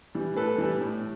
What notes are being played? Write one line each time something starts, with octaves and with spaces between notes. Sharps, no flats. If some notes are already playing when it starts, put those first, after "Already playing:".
E3 G3
A2 A4 B4
E3 G3
A2